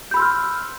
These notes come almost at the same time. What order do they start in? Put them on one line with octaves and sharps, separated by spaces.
G6 B5 E6 C6 F6